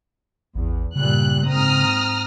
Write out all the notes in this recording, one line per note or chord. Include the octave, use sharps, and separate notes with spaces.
A1 E2
G2 A#2 C#3 G3 F#6
G#2 C4 A#5 D#6 F6